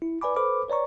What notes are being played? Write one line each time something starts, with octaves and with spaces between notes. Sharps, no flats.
E4
B4 D5 G#5 B5 D6
A4 B4 C5 B5 D6 F6
B4 C#5 D5 A#5 C#6